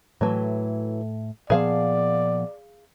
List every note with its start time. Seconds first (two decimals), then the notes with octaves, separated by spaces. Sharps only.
0.21 A2 E3 F#3 A3
1.50 A#2 F3 B3 G#4 D5 F5 A5